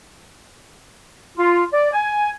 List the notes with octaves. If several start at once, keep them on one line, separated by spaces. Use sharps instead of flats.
F4
D5
G#5